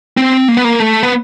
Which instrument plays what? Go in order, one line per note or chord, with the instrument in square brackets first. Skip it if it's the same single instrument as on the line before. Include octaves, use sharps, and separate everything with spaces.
[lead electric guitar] C4
A#3
B3
A#3
A3
B3